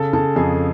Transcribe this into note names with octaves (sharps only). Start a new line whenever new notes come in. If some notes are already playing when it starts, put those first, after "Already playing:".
Already playing: C#3 A4 A5
C#3 A4 A5
F2 G#4 G#5